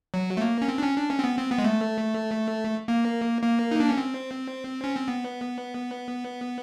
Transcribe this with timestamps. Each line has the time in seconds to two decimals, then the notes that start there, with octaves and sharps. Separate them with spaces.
0.14 F#3
0.37 A3
0.41 A#3
0.62 C#4
0.68 C4
0.78 D4
0.82 C#4
0.96 D4
1.10 C#4
1.19 C4
1.24 B3
1.37 C4
1.51 B3
1.58 G#3
1.64 A3
2.88 A#3
3.42 A#3
3.71 D#4
3.80 D4
3.89 C#4
3.97 C4
4.84 C#4
4.96 C4
5.08 B3